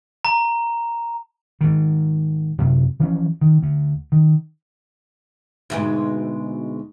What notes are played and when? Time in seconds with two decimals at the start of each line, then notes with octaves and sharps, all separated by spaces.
0.25 A#5
1.61 G#2 D#3
2.58 F#2 C3
3.00 E3 F3 C#4
3.41 D#3
3.62 D2
4.12 D#3
5.70 D2 G#2 B2